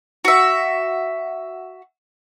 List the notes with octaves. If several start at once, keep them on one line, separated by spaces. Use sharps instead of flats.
F#4 E5